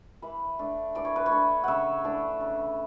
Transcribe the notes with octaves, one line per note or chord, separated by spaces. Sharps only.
E3 B4
A3 D4
E3 D5
C#5
B4
C#5
A3 D4
C#3 E5 F#5
E3 A3 D4
C#3